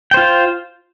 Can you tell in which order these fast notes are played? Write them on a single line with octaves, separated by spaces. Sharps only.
G5 C5 F4